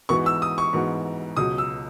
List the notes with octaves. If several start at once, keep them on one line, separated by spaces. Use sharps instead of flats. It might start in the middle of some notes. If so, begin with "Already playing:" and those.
G#2 E3 B3 F#4 C#6
E6
D#6
C#6
G#2 E3 B3 F#4
C#2 B2 F#3 D#6
E6